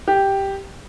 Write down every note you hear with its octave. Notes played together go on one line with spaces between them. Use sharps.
G4